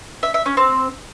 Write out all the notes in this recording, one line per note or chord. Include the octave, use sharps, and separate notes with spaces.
E5
E5
C#4
C4